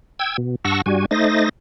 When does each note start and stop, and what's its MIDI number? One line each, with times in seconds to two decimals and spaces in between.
0.19 0.37 79
0.19 0.37 88
0.19 0.37 92
0.38 0.55 47
0.65 0.82 43
0.65 0.82 78
0.65 0.82 81
0.65 0.82 85
0.65 0.82 88
0.65 0.82 94
0.86 1.05 43
0.86 1.05 55
0.86 1.05 66
0.86 1.05 80
1.11 1.49 57
1.11 1.49 63
1.11 1.49 72
1.11 1.49 75
1.11 1.49 93
1.11 1.49 94